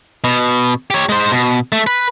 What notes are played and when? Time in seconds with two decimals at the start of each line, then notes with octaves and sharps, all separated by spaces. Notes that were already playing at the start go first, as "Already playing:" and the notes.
0.24 B2
0.90 G4 C#5
1.09 G#3 C5
1.32 B2
1.72 A3
1.87 B4